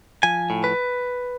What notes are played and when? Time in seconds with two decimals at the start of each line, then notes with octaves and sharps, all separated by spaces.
0.23 F3 G#5
0.50 A2
0.64 B4